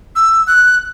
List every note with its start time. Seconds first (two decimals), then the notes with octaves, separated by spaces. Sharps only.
0.16 E6
0.47 F#6